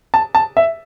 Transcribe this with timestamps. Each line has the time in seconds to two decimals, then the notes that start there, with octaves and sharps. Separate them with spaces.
0.14 A5
0.35 A5
0.57 E5